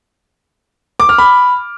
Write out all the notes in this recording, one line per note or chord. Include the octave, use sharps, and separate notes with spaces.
D6
F6
B5